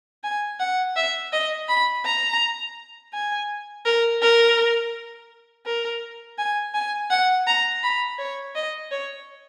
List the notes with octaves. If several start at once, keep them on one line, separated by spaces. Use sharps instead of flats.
G#5
F#5
E5
D#5
B5
A#5
G#5
A#4
A#4
A#4
G#5
G#5
F#5
A#5
B5
C#5
D#5
C#5